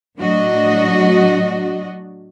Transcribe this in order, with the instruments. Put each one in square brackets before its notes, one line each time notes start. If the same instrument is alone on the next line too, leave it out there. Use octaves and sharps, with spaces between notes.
[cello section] A2 F#3 D4 F#4 D#5